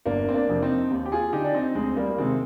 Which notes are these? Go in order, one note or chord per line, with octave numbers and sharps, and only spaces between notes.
G1 A#3 D4
C4
A#3 D4
F2 C3
C4 D#4
D#2
G4
F4 G#4
D3 D#4 G4
D4
C4 D#4
D2 G#3 C4
G3 A#3
A#3
C3 D#3 G#3 C4